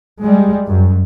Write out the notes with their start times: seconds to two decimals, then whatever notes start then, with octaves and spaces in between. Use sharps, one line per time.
0.22 G3 G#3
0.69 F#2